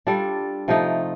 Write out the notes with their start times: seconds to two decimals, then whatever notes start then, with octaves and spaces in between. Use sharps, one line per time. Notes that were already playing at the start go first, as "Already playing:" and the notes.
0.07 G3 D4 F4 A4
0.68 C3 F3 A3 D#4